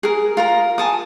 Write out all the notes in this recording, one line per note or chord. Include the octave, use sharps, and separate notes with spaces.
G#4 A#4
F4 A#4 A#5
G#5 A5 D#6